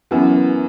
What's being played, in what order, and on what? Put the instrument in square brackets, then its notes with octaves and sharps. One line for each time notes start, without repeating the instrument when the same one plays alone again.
[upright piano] F#2 E3 B3 F#4